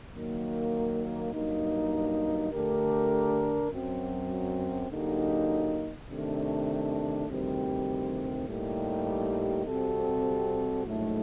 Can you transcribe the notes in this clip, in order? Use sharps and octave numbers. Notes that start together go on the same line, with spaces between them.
D#3 F#3 A#3
G2 F#3 A#3 D#4
D3 A3 D4 G4 A#4
F#2 F#3 C4
D3 F#3 A#3 D#4 G4
C3 D#3 A3 D4
D2 C3 D#3 G3 C4
A2 G3 A#3 D#4 G4
C3 G3 C4 F#4 A4
A#1 A2 F#3 A3 D#4